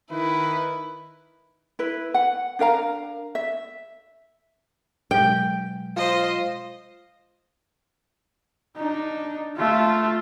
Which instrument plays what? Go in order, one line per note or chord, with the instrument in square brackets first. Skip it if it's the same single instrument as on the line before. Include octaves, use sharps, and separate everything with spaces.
[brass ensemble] D#3 B4 [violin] E4
[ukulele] E4 B4
F#5
D4 A#4 F5 A#5
E5
[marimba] B2 F#3 G#3 [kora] G5
[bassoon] F4 [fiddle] C5 D#5
[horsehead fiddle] D4 D#4
A3 F4